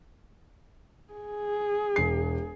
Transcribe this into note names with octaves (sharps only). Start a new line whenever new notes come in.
G#4
E1 C7